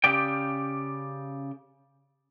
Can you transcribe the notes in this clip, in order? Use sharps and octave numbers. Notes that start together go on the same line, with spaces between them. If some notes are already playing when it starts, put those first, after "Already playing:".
C#3 G4 D5 G5